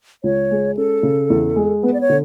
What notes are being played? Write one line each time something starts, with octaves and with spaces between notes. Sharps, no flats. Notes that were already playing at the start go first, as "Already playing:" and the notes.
C#2 C#5
G#3
C#4 A4
C#3
E2
G#3
B3 B4
D5
C#5
D3